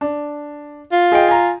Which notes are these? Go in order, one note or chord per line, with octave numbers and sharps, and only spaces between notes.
D4
F4
G#4 D#5 G5
G#5 A#5